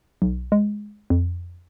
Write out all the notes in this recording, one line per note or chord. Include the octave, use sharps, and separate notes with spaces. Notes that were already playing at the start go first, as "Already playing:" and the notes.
B1
G#3
F2